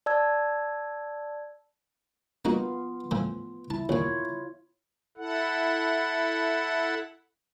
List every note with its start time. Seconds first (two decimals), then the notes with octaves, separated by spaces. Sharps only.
0.06 D5 A5 E6 G#6
2.45 A#3 B3 D#4 F4 F#4
3.11 A2 E3 F3
3.70 E4 A5
3.89 D#2 A#2 F4 C#5
5.18 E4 A4 F#5